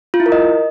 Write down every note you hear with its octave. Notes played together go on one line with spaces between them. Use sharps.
F4
E4
A#4
D#5